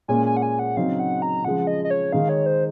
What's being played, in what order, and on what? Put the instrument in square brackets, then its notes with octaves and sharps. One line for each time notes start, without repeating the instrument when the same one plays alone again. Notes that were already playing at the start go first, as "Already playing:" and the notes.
[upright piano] A#2 G#3 C#4 [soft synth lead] G#5
[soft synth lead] G#5
F#5
G#5
F#5
[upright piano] C#3 F#3 C4 D#4 [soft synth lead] F5
[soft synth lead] F#5
A#5
[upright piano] C#3 F3 G#3 [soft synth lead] F#5
[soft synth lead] D#5
D#5
C#5
[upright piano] D#3 G#3 D#4 [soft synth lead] F5
[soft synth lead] C#5
C5